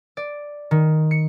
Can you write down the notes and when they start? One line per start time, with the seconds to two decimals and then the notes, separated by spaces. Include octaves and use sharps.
0.17 D5
0.71 D#3
1.11 C#7